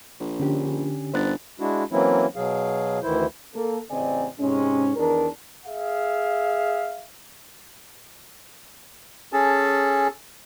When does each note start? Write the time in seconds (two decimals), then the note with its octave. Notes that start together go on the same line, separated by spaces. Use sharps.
0.20 A#1
0.40 D3 C#4 D4 G4
1.14 G1 C5 F#6 A6
1.60 G#3 D4 E4 F#4
1.91 E3 F#3 A#3 C4 C#4 E4
2.36 B2 F#3 G#4 F5
3.03 D2 D#3 E3 E4 C5
3.55 A#3 A4
3.90 A1 C#3 C4 D5 D#5 G#5
4.39 G#2 C3 G#3 C#4
4.96 E2 D#3 D4 A#4
5.66 G#4 E5 F5
9.33 C#4 G#4 A4 A5